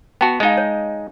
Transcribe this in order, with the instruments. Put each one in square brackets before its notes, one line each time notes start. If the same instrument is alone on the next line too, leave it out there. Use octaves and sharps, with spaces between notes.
[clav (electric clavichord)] B3 F#4 [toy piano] G5 A5
[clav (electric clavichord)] G#3 D#4 [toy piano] D#5 F5
[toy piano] C#5